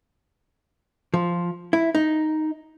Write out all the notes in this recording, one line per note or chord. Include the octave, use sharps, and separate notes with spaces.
F3
E4
D#4